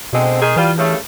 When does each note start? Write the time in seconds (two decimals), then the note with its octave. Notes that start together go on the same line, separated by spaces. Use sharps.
0.13 B2 D3 G#3 C4
0.40 D#3 D#4 G#4
0.56 E3 G3 F4
0.77 G2 C#3 A3